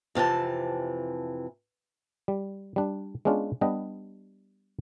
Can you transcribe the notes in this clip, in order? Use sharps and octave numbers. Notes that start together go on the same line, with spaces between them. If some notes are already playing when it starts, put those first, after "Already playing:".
F2 C3 E3 A5
G3
G3 D4
G#3 B3 C#4 D4 F4
G3 B3 D4 G4 D#5